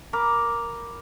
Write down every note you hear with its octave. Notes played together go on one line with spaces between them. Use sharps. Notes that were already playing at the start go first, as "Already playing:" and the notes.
A#4 B5 D6